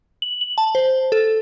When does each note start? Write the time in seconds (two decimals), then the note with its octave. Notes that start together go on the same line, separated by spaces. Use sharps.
0.22 F#7
0.41 F#7
0.58 A5
0.75 C5
1.12 A4